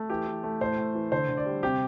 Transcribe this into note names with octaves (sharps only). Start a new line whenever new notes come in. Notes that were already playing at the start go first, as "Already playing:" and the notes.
Already playing: A3
E3 G4
E3
A3
A2 C5
A2
E3
D3 C5
D3
D5
G3
C3 G4